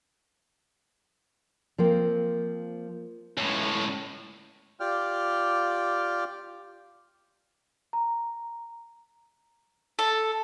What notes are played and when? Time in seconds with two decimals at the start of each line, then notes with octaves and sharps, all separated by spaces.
1.78 F3 A#3 C4
3.37 C#2 A2
4.80 F4 G4 D5 G5 F6
7.93 A#5
9.99 A4